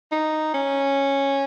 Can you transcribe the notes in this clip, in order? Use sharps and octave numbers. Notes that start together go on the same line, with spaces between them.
D#4
C#4